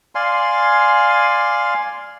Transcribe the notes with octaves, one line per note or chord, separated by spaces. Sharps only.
D5 F5 G#5 C6